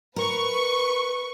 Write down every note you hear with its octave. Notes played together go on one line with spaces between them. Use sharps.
A#4 B4 C#6